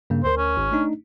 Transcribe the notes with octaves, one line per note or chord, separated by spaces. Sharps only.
G2 C#3 A#3
D2 A#4 C5
C#4
G#1
A3 D4 D#4